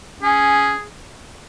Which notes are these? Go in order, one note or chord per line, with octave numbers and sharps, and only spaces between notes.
C#4 G#4